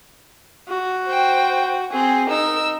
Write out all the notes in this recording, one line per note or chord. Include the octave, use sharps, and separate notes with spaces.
F#4
C5 G5
C4 G#4
D#4 A#4 E6